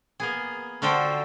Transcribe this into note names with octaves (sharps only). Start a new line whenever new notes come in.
A#3 B3 G#4
D3 F4 F#4 A4 C5 G5